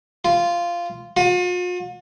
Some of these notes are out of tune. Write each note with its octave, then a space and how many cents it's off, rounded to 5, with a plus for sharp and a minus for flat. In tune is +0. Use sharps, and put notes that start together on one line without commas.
F4 -10
F4 +45